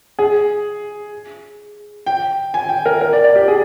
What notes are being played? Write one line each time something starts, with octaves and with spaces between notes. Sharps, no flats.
G#4
G5
G#5
G5
A#4
A#4
D5
D5
G4
G#4